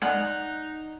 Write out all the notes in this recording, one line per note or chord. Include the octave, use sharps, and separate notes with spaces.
G#3 D#4 D5 F#5 F#6